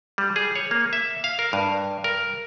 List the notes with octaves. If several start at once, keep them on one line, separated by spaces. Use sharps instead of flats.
G3
G#4
C#5
A#3
E5
F5
A#4
G2
A#4